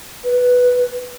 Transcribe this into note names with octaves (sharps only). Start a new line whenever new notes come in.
B4